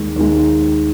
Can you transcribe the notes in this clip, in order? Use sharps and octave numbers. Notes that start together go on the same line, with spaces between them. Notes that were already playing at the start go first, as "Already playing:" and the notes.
Already playing: D#2 D#3 G#3
D#2 D#3 G#3